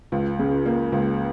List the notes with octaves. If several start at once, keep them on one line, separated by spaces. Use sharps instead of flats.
C#2
C#3
A#3
C#2